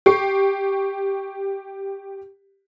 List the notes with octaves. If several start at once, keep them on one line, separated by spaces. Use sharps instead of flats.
G4 C#6 C7